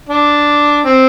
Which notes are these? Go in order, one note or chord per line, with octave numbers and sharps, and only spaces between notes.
D4
C4